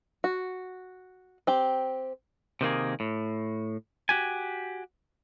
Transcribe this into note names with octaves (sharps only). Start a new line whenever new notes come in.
F#4
C4 G4
C3 D#3 A#3 G#4
A2
F#4 G4 G#5